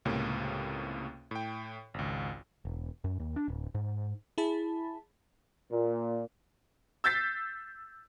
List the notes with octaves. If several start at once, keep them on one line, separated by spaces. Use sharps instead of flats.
C#2 A2 C3 A#3 C#4
A2 G5
G#1 C#2
E1
F#2
D#2
D4
D1
G#2
E4 G#4 A5 B5
A#2
E6 G6 A6 B6 C7